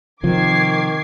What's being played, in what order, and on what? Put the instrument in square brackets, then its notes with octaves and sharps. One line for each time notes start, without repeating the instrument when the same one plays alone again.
[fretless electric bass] C3 F3 [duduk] D#3 [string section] D6 G#6 C7